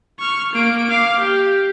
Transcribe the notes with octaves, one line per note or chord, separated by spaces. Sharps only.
C#6 F6
A#3 D7
F5 D6
G4